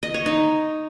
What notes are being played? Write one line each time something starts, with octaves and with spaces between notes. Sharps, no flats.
D#5
C#5
D#4